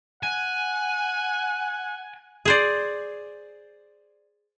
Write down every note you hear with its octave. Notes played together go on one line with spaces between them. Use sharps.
F#5 G#5
G#4 C5 D5